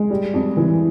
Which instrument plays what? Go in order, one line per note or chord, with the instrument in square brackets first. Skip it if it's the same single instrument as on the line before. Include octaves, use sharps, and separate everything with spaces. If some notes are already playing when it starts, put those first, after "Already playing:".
Already playing: [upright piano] G#3
G3
F2
E3